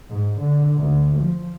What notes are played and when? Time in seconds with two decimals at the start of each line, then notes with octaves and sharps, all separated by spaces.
0.10 G#2
0.40 D3
0.76 D2
1.20 F3